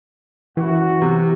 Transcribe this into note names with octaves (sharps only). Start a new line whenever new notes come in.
F#2 E3 F#4
C3